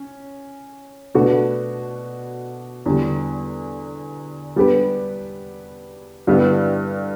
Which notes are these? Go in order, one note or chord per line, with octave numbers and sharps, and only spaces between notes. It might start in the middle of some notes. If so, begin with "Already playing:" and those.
Already playing: C#4
B2 A3 D4 F#4 B4
E2 D3 G3
G3 B3 D4 G4 B4
G2 D3 G3 B3 E4